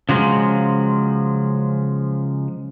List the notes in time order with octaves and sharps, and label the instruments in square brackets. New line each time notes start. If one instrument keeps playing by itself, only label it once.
[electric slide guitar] C#3 F3 F#3 G#3